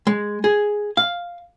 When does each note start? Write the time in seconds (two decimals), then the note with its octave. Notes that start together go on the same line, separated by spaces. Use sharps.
0.07 G#3
0.44 G#4
0.97 F5